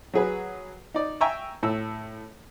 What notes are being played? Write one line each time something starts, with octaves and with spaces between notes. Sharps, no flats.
F#3 G#4 B4
D#4 D5
E5 G5 G#5 A#5 C#6 E6
A2 E6